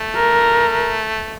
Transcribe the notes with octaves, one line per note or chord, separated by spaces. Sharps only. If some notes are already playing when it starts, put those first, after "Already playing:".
Already playing: A3
A#4